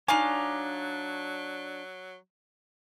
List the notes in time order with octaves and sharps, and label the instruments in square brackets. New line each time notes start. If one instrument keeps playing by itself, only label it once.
[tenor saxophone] F#3 [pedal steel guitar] D4 C#5 [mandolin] D#4 F5 D6 [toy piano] G#5